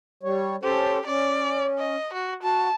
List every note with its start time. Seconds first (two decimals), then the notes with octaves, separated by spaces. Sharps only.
0.23 G3 C#5
0.63 C#4 G4 A4 C5
1.06 C#4 D5
1.79 D#5
2.13 F#4
2.43 F#4 A5